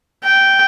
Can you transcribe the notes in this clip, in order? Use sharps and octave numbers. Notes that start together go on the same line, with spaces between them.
G5